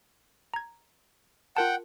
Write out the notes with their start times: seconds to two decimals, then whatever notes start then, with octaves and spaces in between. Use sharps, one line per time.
0.54 A#5 G#6
1.57 F4 A#4 F#5 G5 A5